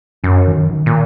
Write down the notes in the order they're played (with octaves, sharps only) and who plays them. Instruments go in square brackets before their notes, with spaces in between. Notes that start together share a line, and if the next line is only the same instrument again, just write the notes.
[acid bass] F#2 [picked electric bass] C#4
[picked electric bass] D#3
D#3
[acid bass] A#2